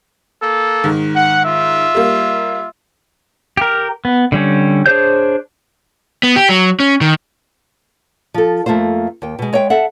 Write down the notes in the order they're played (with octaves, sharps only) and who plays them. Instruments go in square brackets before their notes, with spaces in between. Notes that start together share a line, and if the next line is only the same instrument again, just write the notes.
[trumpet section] A#3 A4
[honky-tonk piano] G#2 D#3
[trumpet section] F#5
F4 E5
[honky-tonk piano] G3 A#3
[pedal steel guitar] G4 A#4
B3
D3 G3 C#4
D4 G#4 C5 C#5 G6
[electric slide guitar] B3
G4
F#3
C#4
D#3
[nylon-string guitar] F3 A4
F2 A3 A#3 F4 C5
D#2 G5
B2 G#3
G#3 C#5 E5 G5
A4 E5 F#5